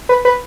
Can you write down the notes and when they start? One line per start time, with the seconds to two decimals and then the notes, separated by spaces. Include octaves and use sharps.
0.09 B4
0.25 B4